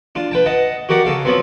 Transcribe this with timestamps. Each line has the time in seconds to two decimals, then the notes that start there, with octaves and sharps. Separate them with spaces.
0.15 D4 F4
0.31 B4 G5 A5
0.46 D#5 F#5 A5
0.89 F#4 G4 A#4 D5 F#5
1.05 C#3 A4 F5
1.25 F3 F#3 B3 C4